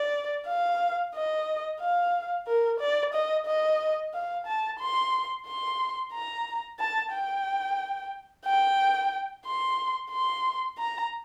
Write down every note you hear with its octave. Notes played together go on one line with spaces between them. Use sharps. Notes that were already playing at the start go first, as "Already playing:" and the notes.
Already playing: D5
F5
D#5
F5
A#4
D5
D#5
D#5
F5
A5
C6
C6
A#5
A5
G5
G5
C6
C6
A#5